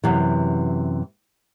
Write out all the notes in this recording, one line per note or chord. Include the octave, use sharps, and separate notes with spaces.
F#2 C3 E3